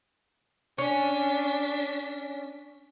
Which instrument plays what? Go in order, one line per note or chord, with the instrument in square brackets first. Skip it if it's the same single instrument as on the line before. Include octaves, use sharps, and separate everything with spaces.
[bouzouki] C#4 [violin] D4 B6